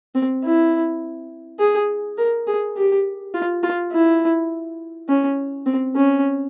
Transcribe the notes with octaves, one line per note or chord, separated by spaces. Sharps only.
C4
E4
G#4
A#4
G#4
G4
F4
F4
E4
C#4
C4
C#4